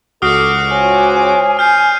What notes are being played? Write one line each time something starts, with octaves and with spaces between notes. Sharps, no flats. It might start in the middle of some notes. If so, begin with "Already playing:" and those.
C#2 F#4 A4 D6 D#6 F6 C7
F4 C5 C#5 G#5
G#5 F6 G6 C7